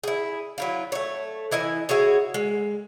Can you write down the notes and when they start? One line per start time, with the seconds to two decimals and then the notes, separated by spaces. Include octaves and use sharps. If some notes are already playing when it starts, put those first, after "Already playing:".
0.04 E4 G#4
0.58 F#3 E4 F4
0.92 A3 C#5
1.51 E3 E4 D#5 G#5
1.89 E4 F#4 G#4 C#5
2.34 G#3